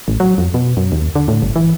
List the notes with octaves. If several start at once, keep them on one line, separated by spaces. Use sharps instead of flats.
A1
F#3
F2
B2
F#2
D#2
D3
A2
G1
E3